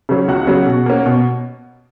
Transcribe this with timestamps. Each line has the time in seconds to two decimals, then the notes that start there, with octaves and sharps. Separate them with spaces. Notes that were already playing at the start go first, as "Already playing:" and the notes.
0.09 C#3 F#3 C#4
0.28 C#2 F#4 F#5
0.47 C#3 F#3 C#4
0.67 B2
0.86 A#3 C#4
1.06 B2